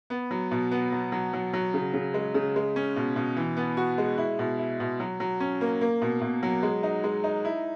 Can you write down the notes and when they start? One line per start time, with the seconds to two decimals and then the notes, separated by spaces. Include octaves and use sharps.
0.10 B3
0.31 F#3
0.51 B2
0.72 B3
0.92 F#3
1.12 F#3
1.33 F#3
1.53 F#3
1.74 C#3
1.94 C#3
2.14 G#3
2.34 C#3
2.56 G#3
2.76 C#4
2.96 B2
3.16 B2
3.37 E3
3.57 B3
3.77 F#4
3.98 G#3
4.18 E4
4.39 B2
4.59 E4
4.80 B2
5.00 F#3
5.20 F#3
5.40 C#4
5.61 A#3
5.81 A#3
6.02 B2
6.22 B2
6.43 F#3
6.63 G#3
6.83 D#4
7.04 G#3
7.24 D#4
7.45 E4